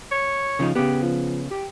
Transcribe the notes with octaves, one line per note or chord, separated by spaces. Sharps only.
C#5
C#3 F3 D#4
C#3 B3 G4
F3
G4